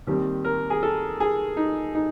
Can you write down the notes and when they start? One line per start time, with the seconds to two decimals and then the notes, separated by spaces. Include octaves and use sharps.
0.07 D#2 D#3 G3 C4 G4
0.45 A#4
0.70 G#4
0.83 A4
1.20 G#4
1.57 D#4
1.95 D#4